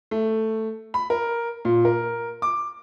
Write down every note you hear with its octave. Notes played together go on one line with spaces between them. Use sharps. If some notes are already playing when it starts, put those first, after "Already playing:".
A3
B5
A#4
A#2
A#4
D6